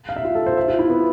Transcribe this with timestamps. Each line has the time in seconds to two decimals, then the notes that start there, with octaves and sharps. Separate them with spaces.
0.09 F5
0.16 E5
0.25 F4
0.35 A4
0.46 C5
0.57 E5
0.68 F4
0.79 E4
0.90 B3